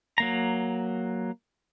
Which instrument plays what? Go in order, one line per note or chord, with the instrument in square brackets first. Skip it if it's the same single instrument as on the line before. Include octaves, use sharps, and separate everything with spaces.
[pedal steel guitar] F#3 A#3 A#5